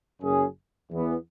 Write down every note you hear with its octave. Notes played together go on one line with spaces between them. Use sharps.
F#1 F#2 F#3 C#4 G#4
E2 E3 B3